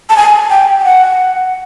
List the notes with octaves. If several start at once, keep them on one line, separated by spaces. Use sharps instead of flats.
A5
G#5
G5
G5
F#5